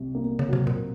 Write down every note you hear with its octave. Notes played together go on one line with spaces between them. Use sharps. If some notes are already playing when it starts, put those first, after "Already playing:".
Already playing: C2 C3
A#3
C#3
F#3
C3
A#2